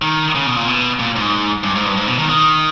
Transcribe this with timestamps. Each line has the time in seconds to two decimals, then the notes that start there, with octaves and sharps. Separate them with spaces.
0.02 D#3
0.35 C#3
0.46 B2
0.56 A#2
0.68 B2
0.99 A#2
1.16 G#2
1.64 G2
1.76 G#2
1.85 G2
1.97 G#2
2.08 B2
2.19 D#3
2.29 D#3